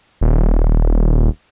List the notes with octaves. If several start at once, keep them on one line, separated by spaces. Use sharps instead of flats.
D#1